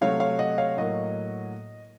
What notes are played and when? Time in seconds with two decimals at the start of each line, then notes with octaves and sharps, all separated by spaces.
0.01 C3 F#3 A3 C4 C#5 F5
0.20 C#5 F5
0.39 D#5 F#5
0.58 C#5 F5
0.77 A2 F#3 A#3 D#5